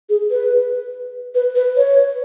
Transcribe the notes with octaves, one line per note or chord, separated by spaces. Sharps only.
G#4
B4
B4
B4
C#5